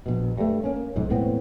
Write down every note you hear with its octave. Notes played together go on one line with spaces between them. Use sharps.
A#1 B2
G2 A3
A#3 C#4
B1 F2 G#2
E1 A2 B3 C4